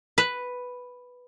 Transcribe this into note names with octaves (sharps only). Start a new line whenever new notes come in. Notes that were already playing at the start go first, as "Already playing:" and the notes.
B4